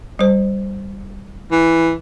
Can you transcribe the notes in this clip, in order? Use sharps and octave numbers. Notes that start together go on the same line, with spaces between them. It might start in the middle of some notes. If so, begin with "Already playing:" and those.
G3 C5
E3